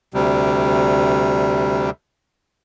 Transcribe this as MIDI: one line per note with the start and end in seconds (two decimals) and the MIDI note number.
0.14 1.90 38
0.14 1.90 48
0.14 1.90 55